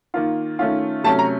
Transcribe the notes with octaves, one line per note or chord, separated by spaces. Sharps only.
D#3 A#3 F4
D#3 A3 C#4 F4
C3 F#3 A3 C#4 A5
A#5